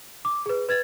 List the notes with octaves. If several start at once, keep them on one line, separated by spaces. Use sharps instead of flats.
D6
G#4 B4
B4 G#6 A6